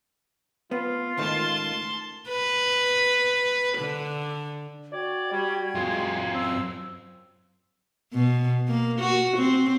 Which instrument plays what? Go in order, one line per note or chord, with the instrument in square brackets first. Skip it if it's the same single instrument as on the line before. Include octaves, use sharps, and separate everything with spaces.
[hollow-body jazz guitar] B3 [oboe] F4
[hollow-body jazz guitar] C#2 A2 D#3 [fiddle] A5 C6
[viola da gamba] B4
D3
[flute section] F#4 G5 G#6 [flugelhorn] D5
[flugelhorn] G3
[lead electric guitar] F#2 F4 [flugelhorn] G#3
[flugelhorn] C4 [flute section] E6
[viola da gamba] B2
A#3
F#4
C4